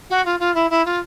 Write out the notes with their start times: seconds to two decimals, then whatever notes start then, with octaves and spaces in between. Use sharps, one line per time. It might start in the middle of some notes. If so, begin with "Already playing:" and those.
0.09 F#4
0.25 F4
0.39 F4
0.54 E4
0.70 E4
0.85 F4